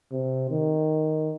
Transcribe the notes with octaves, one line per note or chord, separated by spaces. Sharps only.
C3
D#3